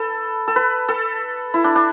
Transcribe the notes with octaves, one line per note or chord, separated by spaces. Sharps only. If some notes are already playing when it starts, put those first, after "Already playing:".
Already playing: A4 B4
A4
B4
A4
E4
D4
D4